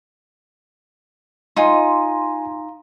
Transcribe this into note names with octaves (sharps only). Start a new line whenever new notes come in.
D#4 F4 G#5 C6